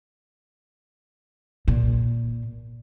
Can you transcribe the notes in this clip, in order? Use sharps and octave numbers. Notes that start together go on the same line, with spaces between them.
A#2